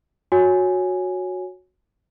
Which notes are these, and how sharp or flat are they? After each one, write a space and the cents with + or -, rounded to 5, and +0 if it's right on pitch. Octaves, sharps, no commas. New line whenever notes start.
F#4 -15 C#5 +0 G#5 +0